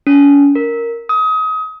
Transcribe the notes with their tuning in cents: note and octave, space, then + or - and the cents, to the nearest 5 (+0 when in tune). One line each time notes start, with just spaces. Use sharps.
C#4 +40
A#4 -5
D#6 +30